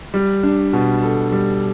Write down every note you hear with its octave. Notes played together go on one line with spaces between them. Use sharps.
G3
D4
B2
A4
G3